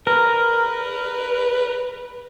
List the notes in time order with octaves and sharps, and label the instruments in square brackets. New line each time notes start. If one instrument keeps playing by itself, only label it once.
[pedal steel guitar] A#4 [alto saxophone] B4